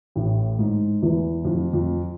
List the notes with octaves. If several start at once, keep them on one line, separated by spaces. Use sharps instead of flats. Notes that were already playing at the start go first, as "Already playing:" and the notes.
A1 A2
G#2
E2 E3
F2 F3
F2 F3